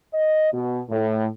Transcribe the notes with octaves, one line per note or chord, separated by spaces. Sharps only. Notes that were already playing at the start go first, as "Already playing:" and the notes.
D#5
B2
A2